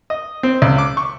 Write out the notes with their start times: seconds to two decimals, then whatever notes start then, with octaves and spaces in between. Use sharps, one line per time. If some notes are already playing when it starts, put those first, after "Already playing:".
0.10 D#5
0.43 C4
0.62 C#2
0.78 D6
0.97 C#6